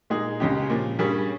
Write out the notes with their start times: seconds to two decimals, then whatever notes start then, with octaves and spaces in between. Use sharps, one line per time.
0.10 A#2 G#3 D#4 G#4
0.40 C#2 C#3 G#3 C#4 G4
0.70 A#2 F3 A#3
0.99 G2 G3 A#3 C#4 G#4